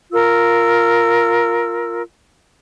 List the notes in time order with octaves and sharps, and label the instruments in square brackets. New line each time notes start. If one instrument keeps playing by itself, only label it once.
[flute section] F4 A#4 E6